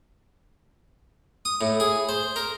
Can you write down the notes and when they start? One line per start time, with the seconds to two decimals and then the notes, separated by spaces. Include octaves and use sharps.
1.45 D#6
1.61 A2
1.80 G#4
2.09 C5
2.36 A#4